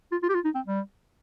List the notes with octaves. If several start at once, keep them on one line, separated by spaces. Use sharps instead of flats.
F4
F4
G4
F4
D#4
C4
G3